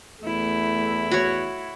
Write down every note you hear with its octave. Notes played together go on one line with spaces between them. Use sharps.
E2 A3 E4
F#4 C#5